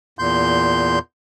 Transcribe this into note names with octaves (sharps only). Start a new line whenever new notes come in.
E2 A#2 C6 G6